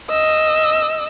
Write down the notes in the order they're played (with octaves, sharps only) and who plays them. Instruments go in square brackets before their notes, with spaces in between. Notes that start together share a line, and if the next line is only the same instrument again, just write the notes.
[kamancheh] D#5 E6